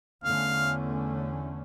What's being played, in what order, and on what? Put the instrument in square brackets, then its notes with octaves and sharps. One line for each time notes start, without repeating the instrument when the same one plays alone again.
[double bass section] E2 D3 A3 C#4 [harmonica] F5